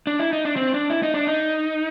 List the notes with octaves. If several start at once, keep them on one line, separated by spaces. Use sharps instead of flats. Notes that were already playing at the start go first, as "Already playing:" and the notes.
D4
E4
D#4
D4
C4
D4
E4
D#4
D4
D#4